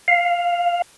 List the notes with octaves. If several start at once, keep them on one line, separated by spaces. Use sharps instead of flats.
F5